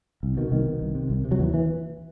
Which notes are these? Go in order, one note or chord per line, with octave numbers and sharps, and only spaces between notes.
C2
B2 D#3
C2 D#3
B2
C2
C3
C2
C3
F#3
D#2 E3
E3